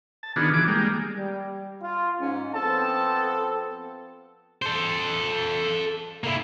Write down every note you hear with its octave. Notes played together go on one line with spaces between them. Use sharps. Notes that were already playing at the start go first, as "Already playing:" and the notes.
A5
D#3 B3 D4 F4 F#4 G#4
E3 G#4 D6
G3 G#3 A#3
G3
F4
G#2 C#4
F3 B3 C4 A4 A5
A4 C5
A#3 E4